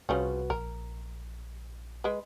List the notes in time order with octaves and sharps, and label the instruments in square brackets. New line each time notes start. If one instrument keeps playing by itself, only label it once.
[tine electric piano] C2 F#4 B4 [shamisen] C#3 F3 C#4
[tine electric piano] A#1 [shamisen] A#4
[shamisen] G#3 B4